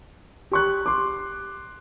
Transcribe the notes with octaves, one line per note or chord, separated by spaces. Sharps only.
G4 C#6 F#6
C6 D6